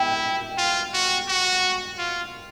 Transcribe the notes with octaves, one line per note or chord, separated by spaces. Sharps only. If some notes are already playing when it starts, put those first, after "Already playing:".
Already playing: E4 G5
F4
F#4
F#4
F4